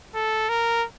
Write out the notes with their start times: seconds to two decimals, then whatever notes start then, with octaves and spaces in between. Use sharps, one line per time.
0.15 A4
0.49 A#4